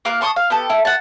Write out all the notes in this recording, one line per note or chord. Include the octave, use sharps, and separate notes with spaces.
A#3 F4 A#4 F#6
A5 C6 C#6 D#6
F5
B3 G4 A4
E4
F#5 A5